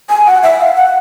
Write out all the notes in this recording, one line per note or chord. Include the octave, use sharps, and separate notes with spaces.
G#5
F#5
E5
F5
F#5